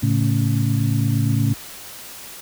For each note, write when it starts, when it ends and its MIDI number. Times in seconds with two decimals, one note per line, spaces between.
0.02 1.53 45
0.02 1.53 49